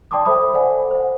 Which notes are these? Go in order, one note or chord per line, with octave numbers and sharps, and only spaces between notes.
D5 G5 A5 C6 D6 D#6
A4 C5 E5 B5 D#6
A4 C5 D5 F#5 G#5
C5 F#5